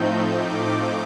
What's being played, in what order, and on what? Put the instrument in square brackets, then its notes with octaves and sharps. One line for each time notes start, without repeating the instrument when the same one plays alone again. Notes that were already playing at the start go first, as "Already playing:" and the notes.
Already playing: [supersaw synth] A2 F3 A3 C4 D#4 G6
D6